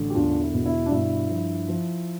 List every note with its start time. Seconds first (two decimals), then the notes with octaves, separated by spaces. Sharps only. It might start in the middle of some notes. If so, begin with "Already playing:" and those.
Already playing: A1 D3
0.10 G4
0.14 E1 D4 F4
0.41 E4
0.53 B2
0.66 E4
0.86 D4
0.91 G2 E4
1.29 F3
1.68 F3